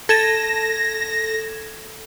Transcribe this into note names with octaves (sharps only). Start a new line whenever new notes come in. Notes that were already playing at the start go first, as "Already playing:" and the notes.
A4 G#6 A#6 E7